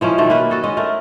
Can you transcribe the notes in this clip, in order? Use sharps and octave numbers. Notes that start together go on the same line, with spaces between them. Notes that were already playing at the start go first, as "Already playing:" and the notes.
E3 F3 G#3 C#4
B2 D#3 A3
A#3 B4
F#4 A4 D#5
G#3 C#4 D#5
A3 A#4